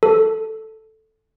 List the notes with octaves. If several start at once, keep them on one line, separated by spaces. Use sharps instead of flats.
A4